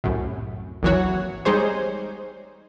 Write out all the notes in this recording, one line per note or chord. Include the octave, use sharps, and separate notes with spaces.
C2 F#2 A2
G#1 D#2 E3 F#3 F#4 C#5
G3 G#3 D#4 G#4 C5 C#5